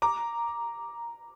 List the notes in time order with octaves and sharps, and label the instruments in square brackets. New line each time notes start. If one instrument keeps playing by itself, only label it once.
[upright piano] A#5 D6